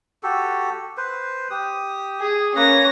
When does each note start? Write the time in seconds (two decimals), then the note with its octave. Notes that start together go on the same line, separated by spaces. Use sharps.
0.23 F#4 G4 A4
0.97 B4 C5
1.50 G4 D#6
2.20 G#4
2.56 A#3 C#4 B4 C#5 A#6